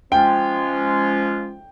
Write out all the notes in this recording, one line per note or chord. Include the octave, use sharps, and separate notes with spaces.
F3 G#3 C#4 F4 G5